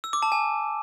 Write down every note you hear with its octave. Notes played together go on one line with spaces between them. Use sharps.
E6
D6
A5
G#5